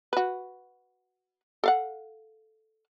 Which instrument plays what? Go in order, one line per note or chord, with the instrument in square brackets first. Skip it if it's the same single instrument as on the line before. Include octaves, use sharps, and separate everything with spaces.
[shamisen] F#4 B4
A4 F5 F#5